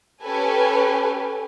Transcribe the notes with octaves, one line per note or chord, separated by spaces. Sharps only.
C#4 G4 A4 B4 G#5